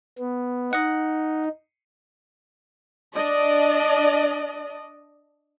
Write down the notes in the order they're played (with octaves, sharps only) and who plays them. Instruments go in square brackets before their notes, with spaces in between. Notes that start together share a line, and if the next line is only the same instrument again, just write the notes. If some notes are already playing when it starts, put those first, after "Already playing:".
[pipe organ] B3
[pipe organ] D#4 [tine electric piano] D#5 F#5
[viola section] D4 D5 D#5